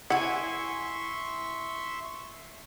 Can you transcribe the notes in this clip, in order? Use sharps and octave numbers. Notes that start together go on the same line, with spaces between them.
E4 E5 F#5 G#5 C6 C#6